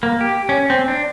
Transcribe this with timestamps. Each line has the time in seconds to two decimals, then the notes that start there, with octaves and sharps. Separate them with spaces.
0.03 A#3
0.21 G4
0.49 C#4
0.70 C4
0.88 D4